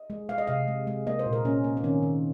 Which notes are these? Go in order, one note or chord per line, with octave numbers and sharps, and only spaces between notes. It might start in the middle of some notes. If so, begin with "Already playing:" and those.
Already playing: D#5
G#3
G#3 F5
D#5
C3 F5
G#3
G#3
A#3 D#5
C5
A#2
A#4
A#3 C#4
A#3
C4
D#3 C#4
D#3